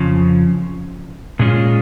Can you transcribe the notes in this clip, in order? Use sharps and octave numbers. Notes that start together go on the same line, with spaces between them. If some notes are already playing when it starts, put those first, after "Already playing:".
Already playing: F2 C#3 F3
A#2 G#3 C#4 F4